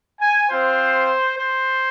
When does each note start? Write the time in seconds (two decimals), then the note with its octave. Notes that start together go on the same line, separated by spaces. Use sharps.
0.20 G#5
0.50 C4 F4 C5
1.38 C5